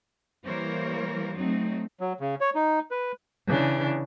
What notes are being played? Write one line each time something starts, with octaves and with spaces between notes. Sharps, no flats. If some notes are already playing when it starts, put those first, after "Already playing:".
E3 G3 A#3 A#4 C5 C#5
F#3 A3 C4 D#4
F#3
C#3
C#5
D#4
B4
C#3 E3 D4